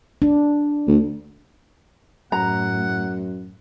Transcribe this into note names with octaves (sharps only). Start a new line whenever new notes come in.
D4
D2
F#2 A2 F#5 A#5